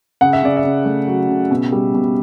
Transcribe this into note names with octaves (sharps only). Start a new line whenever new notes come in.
C#3 F#5
E5
C#3 D5
E5
C#3
A3
F#3
C#3
B2
G3
B2